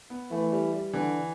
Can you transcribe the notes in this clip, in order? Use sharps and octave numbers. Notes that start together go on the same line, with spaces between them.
B3
E3 A3
G3
G3
D3 E3